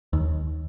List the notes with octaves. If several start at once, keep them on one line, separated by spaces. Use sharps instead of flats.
D#2